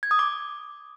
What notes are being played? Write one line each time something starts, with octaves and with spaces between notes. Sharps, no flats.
G#6
D#6
D6